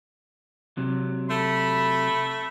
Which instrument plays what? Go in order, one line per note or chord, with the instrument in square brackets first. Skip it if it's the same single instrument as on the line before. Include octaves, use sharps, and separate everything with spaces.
[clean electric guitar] C3 F#3
[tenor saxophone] A3 [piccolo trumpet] B5